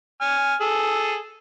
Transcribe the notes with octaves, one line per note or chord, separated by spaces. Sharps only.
G#5 F6
G#4 A4